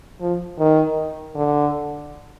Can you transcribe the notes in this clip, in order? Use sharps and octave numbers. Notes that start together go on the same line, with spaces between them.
F3
D#3
D3